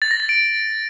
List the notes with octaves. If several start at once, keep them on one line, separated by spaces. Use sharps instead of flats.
A6
A#6
A6
D7